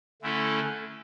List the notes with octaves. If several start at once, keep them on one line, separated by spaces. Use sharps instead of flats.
D3 A3 C#4 E4 A4